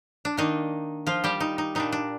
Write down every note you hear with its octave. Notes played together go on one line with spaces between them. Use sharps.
D4
D#3 A#3 D4 D#4
F3 F4
G3 G4
D#4
D#4
A#2 G3 D4 D#4
D4